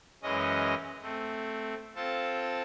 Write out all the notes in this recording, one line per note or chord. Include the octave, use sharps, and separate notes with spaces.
F#2 E3 G#3 C#4 D#5
A3 C4
C4 F4 A4 A5